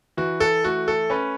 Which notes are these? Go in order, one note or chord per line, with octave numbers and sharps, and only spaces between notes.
E3 F#4
A4
A3 F#4
A4
C#4 B4